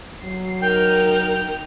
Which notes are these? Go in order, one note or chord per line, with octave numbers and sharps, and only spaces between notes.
F#3 C7
D#4 A#4 G5 F7